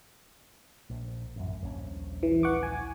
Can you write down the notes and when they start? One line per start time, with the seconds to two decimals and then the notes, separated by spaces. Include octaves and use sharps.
0.90 A#1
1.36 A1 F#2
1.61 D#1 A#1 C#4
2.23 E3
2.43 F#5 C#6 D6
2.63 G#5